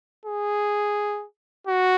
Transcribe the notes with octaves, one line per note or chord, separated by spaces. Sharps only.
G#4
F#4